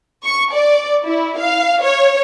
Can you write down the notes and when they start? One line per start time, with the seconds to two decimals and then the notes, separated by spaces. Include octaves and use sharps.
0.24 C#6
0.52 D5
1.05 E4
1.37 F5
1.81 C#5